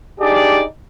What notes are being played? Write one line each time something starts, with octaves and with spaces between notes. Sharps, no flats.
D4 D#4 G4 G#4 D5